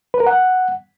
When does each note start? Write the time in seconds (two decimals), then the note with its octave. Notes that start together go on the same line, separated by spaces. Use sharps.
0.14 B4
0.20 A#4
0.27 F#5